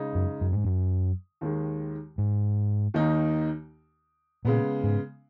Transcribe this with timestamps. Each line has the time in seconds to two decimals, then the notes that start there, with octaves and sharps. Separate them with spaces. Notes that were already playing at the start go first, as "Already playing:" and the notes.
Already playing: C#3 G#3 D#4
0.15 F#2
0.41 F#2
0.52 G#2
0.64 F#2
1.41 D#2 D#3 G#3
2.18 G#2
2.94 D#2 D#3 A#3 D#4
4.45 A#2 C#3 G#3 B3
4.83 G#2